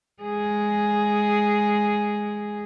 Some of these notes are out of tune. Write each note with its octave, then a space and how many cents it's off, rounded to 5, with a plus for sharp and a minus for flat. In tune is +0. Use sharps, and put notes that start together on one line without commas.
G#3 +0 G#4 +0